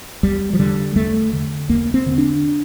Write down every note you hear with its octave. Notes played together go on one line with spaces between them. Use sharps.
E2 G3
F3
D3 G3
E2 A3
D3
E2 A#3
C4
D3
D4